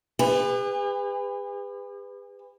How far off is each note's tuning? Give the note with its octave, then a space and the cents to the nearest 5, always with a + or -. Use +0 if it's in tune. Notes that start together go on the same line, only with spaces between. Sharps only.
G#4 -45 B4 +20